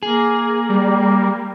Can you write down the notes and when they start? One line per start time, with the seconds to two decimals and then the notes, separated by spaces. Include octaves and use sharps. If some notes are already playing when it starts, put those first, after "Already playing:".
0.03 A#3 G#4
0.69 G3